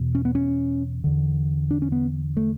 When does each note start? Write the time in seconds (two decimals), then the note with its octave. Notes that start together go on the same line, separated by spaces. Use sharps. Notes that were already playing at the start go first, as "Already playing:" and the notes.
Already playing: E2 B2
0.15 C#4
0.25 B3
0.35 C#4
1.04 E2 D3
1.71 D4
1.82 C#4
1.92 B3
2.37 A3